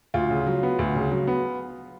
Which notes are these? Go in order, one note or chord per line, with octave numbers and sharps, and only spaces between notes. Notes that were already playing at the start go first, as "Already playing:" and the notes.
D2 F4
C#3
F#3
B3
D2
C#3
F#3
B3